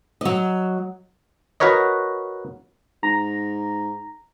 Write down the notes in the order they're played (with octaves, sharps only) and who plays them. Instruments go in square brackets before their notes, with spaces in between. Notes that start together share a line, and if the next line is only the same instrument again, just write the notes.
[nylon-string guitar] F#3 D#5
[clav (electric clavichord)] F#4 A#4 B4 C#5 D#5
[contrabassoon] G#2 [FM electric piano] A#5